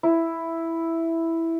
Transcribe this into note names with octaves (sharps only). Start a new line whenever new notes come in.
E4